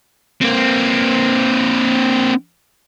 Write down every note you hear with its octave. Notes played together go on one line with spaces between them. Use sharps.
A#3 C4